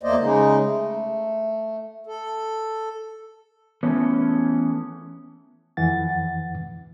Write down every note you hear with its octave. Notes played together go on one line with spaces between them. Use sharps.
E2 A3 A#3 C5 D5 D#5
C#3 G#3 D#4
A3
A4
E3 A3 B3 C#4
F2 E3 F#5 A6